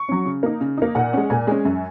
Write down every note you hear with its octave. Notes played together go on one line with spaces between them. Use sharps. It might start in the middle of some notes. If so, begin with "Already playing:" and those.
Already playing: C#6
F#3 C#4
C#3
A#3 D#4
C#3
A#3 D#4
A#2 F#5
G#3 C#4
A#2 G#5
G#3 C#4
F#2